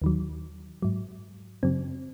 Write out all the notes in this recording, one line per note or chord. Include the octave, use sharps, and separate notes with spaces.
D#2 D#3 F#3
G#2 F#3
F#2 C#3 F#3 C4